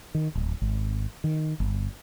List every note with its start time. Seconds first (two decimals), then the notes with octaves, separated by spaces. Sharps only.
0.15 D#3
0.35 D1
0.62 G#1
1.24 D#3
1.60 G1